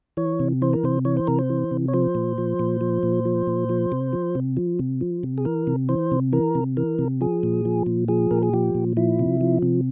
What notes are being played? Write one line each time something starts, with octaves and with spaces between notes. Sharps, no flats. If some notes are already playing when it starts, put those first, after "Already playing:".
E3 C#5
C3
E3 C5
A#4
C3 C5
E3 C#5
C5
C3 A#4
C5
E3
C3
C#5
F3 C5
A#2
F3
A#2
F3
A#2
F3
A#2
F3
C3
F3
C3
F3
C3
F3
C3
G#4
E3 A#4
C3
E3 C5
C3
E3 A#4
C3
E3 A#4
C3
F3 G#4
A#2
F3
A#2
F3 G#4
A#2 A#4
G#4
F3 G4
A#2
F3 E4
C3
F3
C3